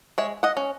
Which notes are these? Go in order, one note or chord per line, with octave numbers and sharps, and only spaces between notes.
G#3 C#5 E5
D#5 F#5
C#4